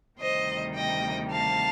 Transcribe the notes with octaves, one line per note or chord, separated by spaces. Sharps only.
D2 C3 D#3 G3 C5 D#5
D#5 G5
F5 A5